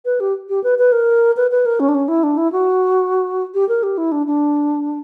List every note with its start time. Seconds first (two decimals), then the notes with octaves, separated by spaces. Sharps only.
0.05 B4
0.20 G4
0.49 G4
0.64 B4
0.78 B4
0.92 A#4
1.37 B4
1.51 B4
1.66 A#4
1.80 C#4
1.88 D4
1.95 C#4
2.08 E4
2.23 D4
2.37 E4
2.52 F#4
3.54 G4
3.69 A#4
3.83 G4
3.98 E4
4.12 D4
4.27 D4